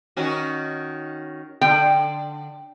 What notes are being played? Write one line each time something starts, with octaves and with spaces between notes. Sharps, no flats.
D#3 C#4 F#4
D3 G5